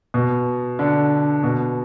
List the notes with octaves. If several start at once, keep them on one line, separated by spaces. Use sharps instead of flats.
B2
D3
B2